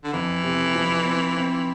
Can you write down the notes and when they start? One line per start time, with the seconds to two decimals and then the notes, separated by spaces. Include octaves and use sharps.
0.04 D3
0.13 F2 E3
0.44 C3
0.75 F3
1.05 C4
1.37 C4